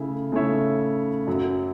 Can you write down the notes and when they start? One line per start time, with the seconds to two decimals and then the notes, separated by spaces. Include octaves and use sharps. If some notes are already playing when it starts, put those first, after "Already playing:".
Already playing: C#3 A3 E4
0.32 C#3 A3 E4 C#5 E5
1.27 F#2 F#3 C#4